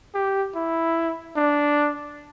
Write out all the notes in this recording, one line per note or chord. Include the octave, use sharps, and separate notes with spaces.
G4
E4
D4